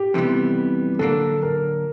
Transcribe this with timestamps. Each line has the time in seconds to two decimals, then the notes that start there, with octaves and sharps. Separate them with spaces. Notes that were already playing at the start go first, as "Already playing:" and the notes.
Already playing: G4
0.14 F2 C3 E3 G3 B3
0.99 D3 F#3 A#3 D4 A4
1.43 A#4